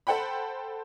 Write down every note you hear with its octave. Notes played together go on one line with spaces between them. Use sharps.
A4 C5 F#5 G5 B5